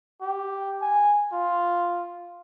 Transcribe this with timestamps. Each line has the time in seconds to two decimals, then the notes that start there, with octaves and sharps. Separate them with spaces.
0.22 G4
0.81 G#5
1.32 F4